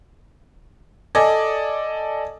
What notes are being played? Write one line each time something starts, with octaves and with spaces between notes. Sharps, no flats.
A4 D5 D#5 G#5